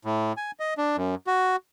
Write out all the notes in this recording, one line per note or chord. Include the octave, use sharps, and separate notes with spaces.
A2
G#5
D#5
D4
F#2
F#4